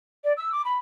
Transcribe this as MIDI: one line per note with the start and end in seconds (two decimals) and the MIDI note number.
0.24 0.33 74
0.37 0.50 88
0.52 0.62 86
0.65 0.78 83